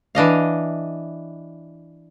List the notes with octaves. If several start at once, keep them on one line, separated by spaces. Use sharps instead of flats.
E3 D4 D#5 F5